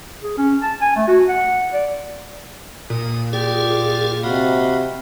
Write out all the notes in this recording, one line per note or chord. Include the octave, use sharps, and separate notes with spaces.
G#4
C#4
A5
G#5
A3
F#4
F#5
D5
A#2 D#6
F4 G4 G#4 D5
C3 F#4 D#5 F5 B5